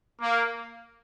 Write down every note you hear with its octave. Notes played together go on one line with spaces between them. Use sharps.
A#3